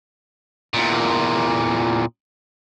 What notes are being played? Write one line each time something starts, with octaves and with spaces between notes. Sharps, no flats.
E2 A#2